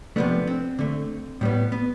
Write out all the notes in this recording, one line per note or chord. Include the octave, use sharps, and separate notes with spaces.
C3 F3 A3 B3 D4
C4
D3 A3
A2 G3 B3
B3